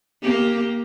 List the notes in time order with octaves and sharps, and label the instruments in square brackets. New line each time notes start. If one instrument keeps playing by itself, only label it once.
[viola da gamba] A#3 G4